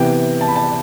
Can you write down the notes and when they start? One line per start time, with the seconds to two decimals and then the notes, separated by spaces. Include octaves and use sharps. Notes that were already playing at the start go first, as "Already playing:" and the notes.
Already playing: C3 E3 B3 G5
0.41 A5
0.48 B5
0.56 A5